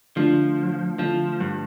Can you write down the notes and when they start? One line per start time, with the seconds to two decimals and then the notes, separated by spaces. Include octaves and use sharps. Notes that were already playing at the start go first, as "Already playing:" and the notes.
0.16 D3 F3 A3 D4 F4
0.99 D3 F3 A3 D4 F4
1.40 G2